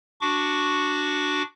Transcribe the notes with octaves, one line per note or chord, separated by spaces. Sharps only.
D4 F#4 C#6 D6